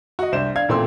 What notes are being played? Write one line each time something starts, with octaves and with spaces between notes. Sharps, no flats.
F#4 D#5
C2 D4 C5 E7
D4 F5 G#6
A1 A#2 C4 A4 C6 E6